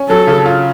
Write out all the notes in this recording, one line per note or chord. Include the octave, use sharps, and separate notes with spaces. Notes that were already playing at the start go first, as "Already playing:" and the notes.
Already playing: C#4
F#3 A4
C#3
F4